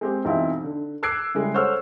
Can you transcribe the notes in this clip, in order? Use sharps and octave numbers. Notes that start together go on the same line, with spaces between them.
G#3 C4 G4
B1 E3 C4 E4 C5 F5
D3
D6 E6 F#6 G#6 C7 D7
C#3 G3 G#3 E4
A4 C5 C#5 F#5 E6 F6